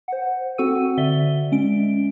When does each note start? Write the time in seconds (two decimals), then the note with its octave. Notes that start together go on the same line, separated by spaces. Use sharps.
0.08 C5 F#5
0.58 C4 F#4 A4 F#5 E6 D#7
0.98 D3 D5 E5 G7
1.52 G#3 C#4 D7